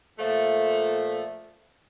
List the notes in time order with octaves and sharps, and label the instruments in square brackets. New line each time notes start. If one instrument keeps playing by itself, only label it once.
[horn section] A#2 F3 A3